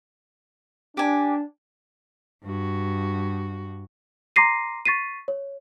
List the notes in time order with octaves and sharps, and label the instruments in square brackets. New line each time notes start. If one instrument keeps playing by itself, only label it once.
[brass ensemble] D4 [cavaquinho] G4 G#5
[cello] G2 F#4
[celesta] A#5 C6 D6 A#6 C7 D#7
C#6 A6 B6 C7 D#7
C#5